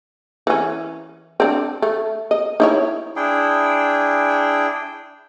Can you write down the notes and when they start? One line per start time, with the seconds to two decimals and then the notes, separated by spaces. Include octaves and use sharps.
0.47 E3 C#4
1.40 C4 D4
1.82 A3
2.31 D#5
2.60 D#4 E4 C#5
3.16 D4 E4 G#4 G5